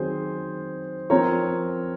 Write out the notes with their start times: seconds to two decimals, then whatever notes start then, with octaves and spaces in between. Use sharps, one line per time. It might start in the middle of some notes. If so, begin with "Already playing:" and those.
Already playing: D#3 F#3 C4 G#4 C5
1.10 F3 C4 A#4 C#5